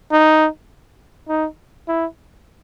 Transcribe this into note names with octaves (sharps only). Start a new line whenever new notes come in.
D#4
D#4
E4